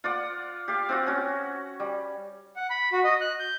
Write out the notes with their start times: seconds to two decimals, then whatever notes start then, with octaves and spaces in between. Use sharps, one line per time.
0.04 F4 D5 F#5
0.68 G4 F5
0.89 C4 F4 F#4
1.07 C#4 F#4
1.80 G3
2.56 F#5
2.70 B5
2.92 F#4
3.04 D#5
3.21 F#6
3.39 G6